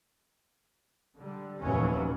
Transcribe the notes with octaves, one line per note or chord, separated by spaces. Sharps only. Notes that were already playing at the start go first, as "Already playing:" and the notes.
D3 G3
F1 D#2 A#2 E3 F#3 C#4